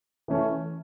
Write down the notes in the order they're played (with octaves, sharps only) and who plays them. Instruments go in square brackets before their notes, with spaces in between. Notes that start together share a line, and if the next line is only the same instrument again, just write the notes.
[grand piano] E3 A3 C#4